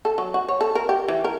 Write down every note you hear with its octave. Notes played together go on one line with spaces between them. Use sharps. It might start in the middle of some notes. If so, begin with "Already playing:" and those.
A4
F#3
F#4
C#5
A4
A#4
G4
E3
A#4